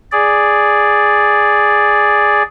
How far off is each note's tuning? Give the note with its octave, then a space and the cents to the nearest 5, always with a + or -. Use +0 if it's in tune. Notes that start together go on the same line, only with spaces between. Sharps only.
G#4 +0 D5 +0